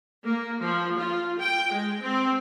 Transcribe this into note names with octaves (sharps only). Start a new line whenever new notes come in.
A#3
F3
F4
G5
G#3
C4